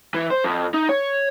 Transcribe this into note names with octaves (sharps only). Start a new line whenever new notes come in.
E3
C5
F2
D#4
C#5